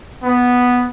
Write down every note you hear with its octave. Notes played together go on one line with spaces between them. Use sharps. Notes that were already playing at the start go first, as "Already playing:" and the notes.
B3